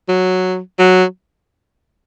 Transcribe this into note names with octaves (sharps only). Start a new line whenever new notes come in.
F#3
F#3